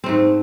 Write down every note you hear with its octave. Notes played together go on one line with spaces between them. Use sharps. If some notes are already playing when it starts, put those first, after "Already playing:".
G#2 A3 C4